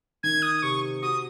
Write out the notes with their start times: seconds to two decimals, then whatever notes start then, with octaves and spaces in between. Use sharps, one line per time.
0.23 D#3 G#6
0.42 D#6
0.63 C3 C#6
1.02 F#4 D#6